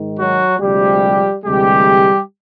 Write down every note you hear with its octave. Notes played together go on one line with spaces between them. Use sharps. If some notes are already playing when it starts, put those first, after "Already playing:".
Already playing: G#2 D#3
F#3 F#4
D2 C3 F3 G3 G#3 G4
D2 C3 E3 G3 G#3 G4